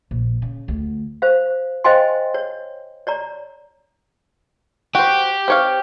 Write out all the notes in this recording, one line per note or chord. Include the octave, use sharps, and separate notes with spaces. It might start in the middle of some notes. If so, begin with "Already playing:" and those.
A#1
C#3
D2
C5 F5
C5 D#5 F5 G5 G#5 C6
C#5
C#5 D5 A#5
F#4 G4 C5
C4 C#5 F5